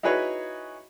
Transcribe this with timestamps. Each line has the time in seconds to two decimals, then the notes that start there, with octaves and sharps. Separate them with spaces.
0.03 D#4 E4 F#4 G#4 B4 C#5